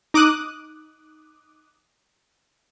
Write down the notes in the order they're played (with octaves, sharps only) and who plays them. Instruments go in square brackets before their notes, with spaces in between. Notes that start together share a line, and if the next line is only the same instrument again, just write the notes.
[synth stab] D#4 D6 D#6 F#6